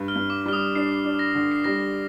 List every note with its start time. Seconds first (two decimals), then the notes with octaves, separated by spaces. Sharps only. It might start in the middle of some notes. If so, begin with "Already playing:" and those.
Already playing: G2
0.08 F6
0.15 G2
0.30 D6
0.46 G3 F6
0.53 D#6
0.75 D4 C7
1.05 D4
1.19 A#6
1.35 D3
1.51 C7
1.64 G3 A#6